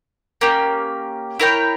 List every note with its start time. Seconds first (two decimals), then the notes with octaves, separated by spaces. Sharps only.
0.41 A#3 C#4 G4
1.39 E4 A#4 C#5 G5